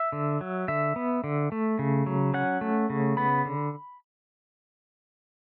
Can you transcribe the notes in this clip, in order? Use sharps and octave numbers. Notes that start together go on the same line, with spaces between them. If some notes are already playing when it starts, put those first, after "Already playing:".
Already playing: E5
D3
F#3
D3 E5
B3
D3
A3
C#3
F#3
C#4 F#5
A3
C#3
B3 B5
D3